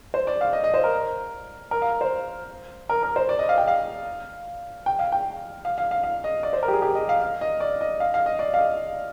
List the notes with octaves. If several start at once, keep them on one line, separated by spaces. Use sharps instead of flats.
C5
D5
F5
D#5
D#5
C5
A#4
A#4
F5
C5
A#4
A#4
C5
D5
D#5
F5
G5
F5
G5
F5
G5
F5
F5
F5
F5
D#5
D5
C5
A#4
G4
G#4
G4
D#5
F5
F5
D#5
D5
D#5
F5
F5
D#5
D5
F5
D#5